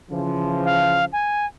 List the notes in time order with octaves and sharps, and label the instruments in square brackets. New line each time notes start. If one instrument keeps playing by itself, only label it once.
[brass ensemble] C#3 E3 F3
[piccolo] F5
G#5